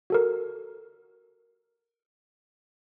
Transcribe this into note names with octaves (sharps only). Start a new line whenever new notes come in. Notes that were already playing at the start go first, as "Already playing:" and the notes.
F#4 A4 A#4